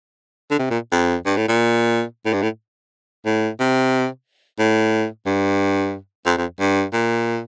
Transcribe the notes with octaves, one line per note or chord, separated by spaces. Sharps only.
D3
C3
A#2
F2
G2
A2
A#2
A2
G2
A2
A2
C3
A2
G2
F2
F2
G2
A#2